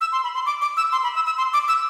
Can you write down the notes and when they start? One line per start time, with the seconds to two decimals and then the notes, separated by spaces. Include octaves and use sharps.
0.01 E6
0.12 C6
0.24 B5
0.35 C6
0.46 D6
0.62 D6
0.77 E6
0.92 C6
1.03 B5
1.15 E6
1.26 E6
1.38 C6
1.54 D6
1.68 E6